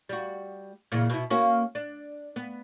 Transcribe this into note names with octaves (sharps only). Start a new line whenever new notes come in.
G3 F#4
A#2 C#3 E3
B2 E4
A#3 C#4 F#4
D4
B3